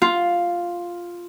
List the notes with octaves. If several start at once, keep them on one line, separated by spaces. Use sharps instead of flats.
F4